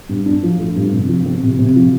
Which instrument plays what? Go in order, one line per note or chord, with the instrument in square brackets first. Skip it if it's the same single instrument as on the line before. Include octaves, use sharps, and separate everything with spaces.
[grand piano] G2
D4
F3
A3
G2
C3
F3
C4
C3
C3
F3